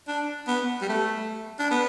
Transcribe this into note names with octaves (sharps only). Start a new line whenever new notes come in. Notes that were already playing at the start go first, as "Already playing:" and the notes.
D4
B3
G3
A3
D4
B3